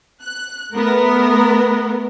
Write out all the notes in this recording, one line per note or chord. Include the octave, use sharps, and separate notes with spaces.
F#6
A3 B3 A#4